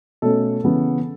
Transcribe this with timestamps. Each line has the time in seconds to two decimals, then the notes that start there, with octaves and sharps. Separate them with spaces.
0.22 B2 A3 C#4 A4
0.64 C#3 E3 B3